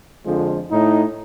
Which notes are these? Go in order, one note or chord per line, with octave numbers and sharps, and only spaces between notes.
F2 D3 F3 G#3
A2 D#4